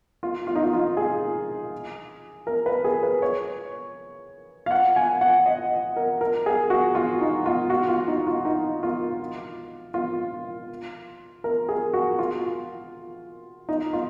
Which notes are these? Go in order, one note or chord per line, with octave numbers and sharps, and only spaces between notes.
F4
F4
D#4
F4
F4
G#4
A#4
B4
G#4
B4
C#5
F5
F#5
G#5
F#5
D#5
A#4
A#4
G#4
F#4
F4
D#4
F4
F#4
F4
D#4
F4
D#4
F4
F4
A#4
G#4
F#4
F4
D#4
F4